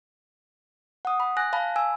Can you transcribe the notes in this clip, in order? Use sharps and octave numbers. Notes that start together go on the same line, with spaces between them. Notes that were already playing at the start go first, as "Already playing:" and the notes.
F#5 D#6
B5
G#5 F#6 A#6
F5 A5 B5
G#5 E6